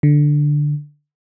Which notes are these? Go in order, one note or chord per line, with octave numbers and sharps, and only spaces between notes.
D3